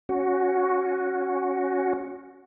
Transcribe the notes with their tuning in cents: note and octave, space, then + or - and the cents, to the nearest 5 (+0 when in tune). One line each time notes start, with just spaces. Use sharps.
C#4 +0 F#4 +0